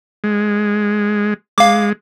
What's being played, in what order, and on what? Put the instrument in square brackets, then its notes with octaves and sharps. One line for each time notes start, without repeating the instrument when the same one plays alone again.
[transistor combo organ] G#3
[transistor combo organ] G#3 [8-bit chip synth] F5 D6